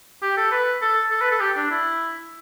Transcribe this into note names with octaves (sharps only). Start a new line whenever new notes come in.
G4
A4
B4
A4
A4
B4
A4
G4
D4
E4